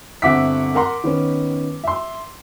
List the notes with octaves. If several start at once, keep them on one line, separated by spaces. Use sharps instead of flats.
G1 C4 E5 F#5 D6 B6
A#4 F#5 A#5 C6
D#3 B3 C#4
E5 C6